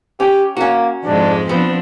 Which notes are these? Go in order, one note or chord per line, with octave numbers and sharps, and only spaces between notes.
C#4 G4
A#3 C#4 F#4
F2 G#2 G#3 D4
F3 B3 C4 D4 B4